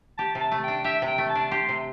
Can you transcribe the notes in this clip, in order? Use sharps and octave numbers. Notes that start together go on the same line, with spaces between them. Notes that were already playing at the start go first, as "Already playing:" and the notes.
G4 A5
C3
A5
A3
D4 G5
G4 E5
C3 G5
A3
A5
D4
G4 C6
C3